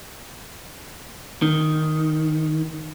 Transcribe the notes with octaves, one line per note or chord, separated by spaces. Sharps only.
D#3